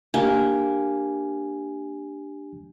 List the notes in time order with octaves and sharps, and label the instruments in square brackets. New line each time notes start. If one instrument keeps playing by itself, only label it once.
[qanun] A#3 [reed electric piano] D4 G4 G#5